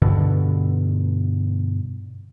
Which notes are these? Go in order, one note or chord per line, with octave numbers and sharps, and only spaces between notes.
G2 B2 D3